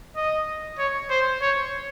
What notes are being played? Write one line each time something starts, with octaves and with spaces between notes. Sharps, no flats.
D#5
C#5
C5
C#5